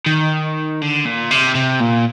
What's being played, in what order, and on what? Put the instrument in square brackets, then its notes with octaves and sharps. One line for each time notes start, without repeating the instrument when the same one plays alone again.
[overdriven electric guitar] D#3
D3
A#2
C3
C3
A#2